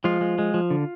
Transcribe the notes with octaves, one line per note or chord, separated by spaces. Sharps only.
F3 G#3 F4
G#3
G#3
F3
D3